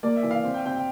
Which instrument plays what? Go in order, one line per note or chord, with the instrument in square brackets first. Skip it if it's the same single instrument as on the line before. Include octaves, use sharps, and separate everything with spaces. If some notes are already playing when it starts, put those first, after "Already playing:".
[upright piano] A#3 [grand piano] D5
[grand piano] E5
[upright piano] E3
[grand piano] F5
[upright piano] C4
[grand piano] G5
[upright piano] C4 [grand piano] G5
[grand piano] G5